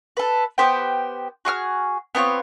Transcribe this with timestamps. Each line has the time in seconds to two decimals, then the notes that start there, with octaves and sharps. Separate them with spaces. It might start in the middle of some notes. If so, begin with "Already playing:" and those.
0.17 A4 B4
0.58 B3 G4 C5 G5
1.45 F#4 G#4 C#6 F6
2.15 B3 C4 F4 C#5